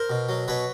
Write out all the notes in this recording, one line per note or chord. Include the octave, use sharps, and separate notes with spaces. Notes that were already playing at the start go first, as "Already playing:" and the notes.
Already playing: A#4 C5
B2
F#3
B2 B4 C#5